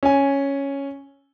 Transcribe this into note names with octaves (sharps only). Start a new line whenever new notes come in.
C#4 G#5